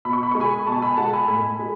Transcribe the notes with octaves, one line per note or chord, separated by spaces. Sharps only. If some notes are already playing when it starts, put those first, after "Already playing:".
B2 B5
C#6
B5
G#3 C#6
G#5 B5
B2 A5 C#6
G#5 B5
G#3 F#5 A5
G#5 B5
A2 G#5 B5
G#3